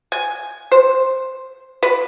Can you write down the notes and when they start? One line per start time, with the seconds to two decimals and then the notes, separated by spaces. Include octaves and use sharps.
0.12 G#5
0.72 C5
1.83 B4